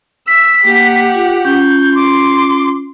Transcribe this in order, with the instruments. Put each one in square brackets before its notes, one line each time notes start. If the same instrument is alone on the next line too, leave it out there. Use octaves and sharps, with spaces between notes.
[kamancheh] E6 [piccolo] B6
[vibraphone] A#3 [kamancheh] G4 F#5
[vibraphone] F4
[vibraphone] C#4 F4 [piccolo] G6
[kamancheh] C6 [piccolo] D6